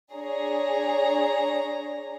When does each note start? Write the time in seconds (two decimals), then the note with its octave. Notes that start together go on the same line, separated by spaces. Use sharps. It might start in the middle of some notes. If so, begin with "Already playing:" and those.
0.12 D4 G#4 C#5 A#5